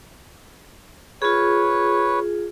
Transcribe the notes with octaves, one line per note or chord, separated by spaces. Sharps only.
F4 G#4 B4 C#5